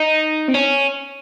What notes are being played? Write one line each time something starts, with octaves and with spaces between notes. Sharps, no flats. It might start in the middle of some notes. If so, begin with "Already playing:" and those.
Already playing: D#4
C4
C#4